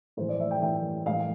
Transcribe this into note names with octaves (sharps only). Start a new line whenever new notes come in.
A2 E3 C5
D5
E5
G5
A2 E3 G5
A2 E3 F5